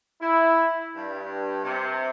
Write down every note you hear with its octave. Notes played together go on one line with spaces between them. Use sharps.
E4
G2
C3